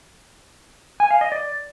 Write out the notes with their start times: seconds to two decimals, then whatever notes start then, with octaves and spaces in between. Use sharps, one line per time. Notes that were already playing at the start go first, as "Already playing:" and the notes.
1.00 G#5
1.11 F5
1.21 D#5
1.32 D5